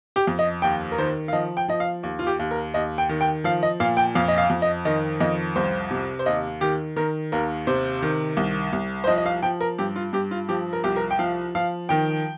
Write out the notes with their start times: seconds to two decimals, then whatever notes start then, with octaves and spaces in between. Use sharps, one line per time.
0.16 G4
0.27 F2
0.39 D#5
0.62 D#2 G5
0.92 A#4
0.98 D#3 C5
1.28 F5
1.33 F3 D#5
1.57 G5
1.68 F3 D#5
1.80 F5
2.03 D#2
2.19 F4
2.27 G4
2.39 D#2
2.51 A#4
2.74 D#2 D#5
2.98 G5
3.09 D#3
3.21 G5
3.44 F3 F5
3.63 D#5
3.80 A#2 F5
3.97 G5
4.15 F2 F5
4.28 D#5
4.38 F5
4.50 F2
4.62 D#5
4.85 D#3 D#5
5.20 F2 D#5
5.56 C2 C5
5.91 C3
6.19 C5
6.26 D#2 D#5
6.61 D#3 G4
6.96 D#3 A#4
7.32 D#2 A#4
7.67 C3 C5
8.02 D#3
8.37 C2
8.73 C2
9.04 C5
9.07 F3 D#5
9.18 D#5
9.26 F5
9.43 F3 G5
9.61 A#4
9.78 G2 G4
9.96 F4
10.13 G2 G4
10.31 F4
10.49 F3 G4
10.73 A#4
10.84 C2 G4
10.96 A#4
11.11 G5
11.19 F3 F5
11.55 F3 F5
11.89 D#3 G5